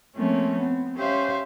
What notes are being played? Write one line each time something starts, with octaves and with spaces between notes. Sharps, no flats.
F3 A3 A#3 C4 C#4
B3 C4
C#4 G4 C5 E5 F5